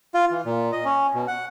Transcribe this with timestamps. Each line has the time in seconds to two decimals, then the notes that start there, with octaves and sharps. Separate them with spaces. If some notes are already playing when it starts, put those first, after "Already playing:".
0.14 F4
0.31 E3
0.45 A#2
0.72 D#5
0.85 C#4
1.14 B2
1.27 F#5